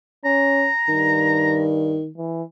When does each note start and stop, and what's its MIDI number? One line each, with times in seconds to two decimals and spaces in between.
0.25 0.69 61
0.25 1.60 82
0.88 1.99 43
0.88 2.08 51
2.18 2.43 52